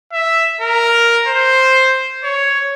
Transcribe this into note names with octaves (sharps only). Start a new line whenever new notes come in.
E5
A#4
C5
C#5